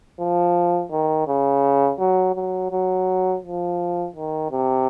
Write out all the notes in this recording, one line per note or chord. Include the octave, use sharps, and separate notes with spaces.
F3
D#3
C#3
F#3
F#3
F#3
F3
D#3
C3